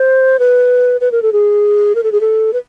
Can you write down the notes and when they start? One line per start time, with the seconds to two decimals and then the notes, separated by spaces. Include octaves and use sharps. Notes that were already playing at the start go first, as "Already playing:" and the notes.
Already playing: C5
0.39 B4
1.01 B4
1.12 A#4
1.22 A4
1.32 G#4
1.95 A#4
2.03 A4
2.12 G#4
2.21 A4
2.53 B4